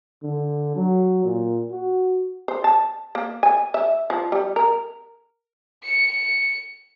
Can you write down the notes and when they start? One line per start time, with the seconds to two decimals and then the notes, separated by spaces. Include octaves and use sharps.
0.23 D3
0.76 F#3
1.25 A#2
1.71 F#4
2.48 C5
2.64 A5
3.15 A#3
3.43 G#5
3.74 E5
4.10 F3
4.32 G3
4.56 A#4
5.84 C#7